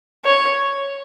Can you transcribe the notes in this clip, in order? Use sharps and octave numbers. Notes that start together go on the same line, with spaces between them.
C#5